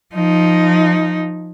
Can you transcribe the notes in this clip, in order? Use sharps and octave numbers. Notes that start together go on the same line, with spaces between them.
F3 D#4